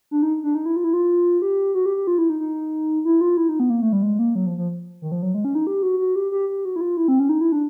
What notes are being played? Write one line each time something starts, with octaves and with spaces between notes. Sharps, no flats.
D4
D#4
D4
D#4
E4
F4
E4
F4
G4
F#4
G4
G4
F4
E4
D#4
D#4
E4
F4
E4
D#4
B3
A#3
A3
G3
G#3
A#3
F#3
F3
F3
D#3
F3
F#3
G#3
C#4
D#4
G4
F#4
F#4
G4
G4
G4
F#4
E4
F4
E4
C4
C#4
D#4
E4
D4